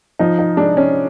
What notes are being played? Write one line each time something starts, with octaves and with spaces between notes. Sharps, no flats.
F3 D#4
D#4
G#3 D4
C#4